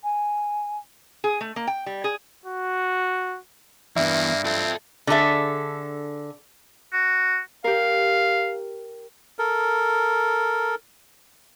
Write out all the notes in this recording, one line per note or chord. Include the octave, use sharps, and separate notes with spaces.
G#5
G#4
A3
A#3
G5
G3
G#4
F#4
G2 E3 A#3 B3 E5
C4 F4 A4
D3 G#4 A4 E5
F#4
G4 A#4 F5
A4 A#4